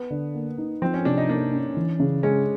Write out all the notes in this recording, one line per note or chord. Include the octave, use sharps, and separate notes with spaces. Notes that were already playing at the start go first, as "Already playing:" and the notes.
Already playing: B3
D3
A#3
D#4
F3 C4
C#4
C3 D4
D#4
A#3 D4
C#4
E3
C#3
G#3 C#4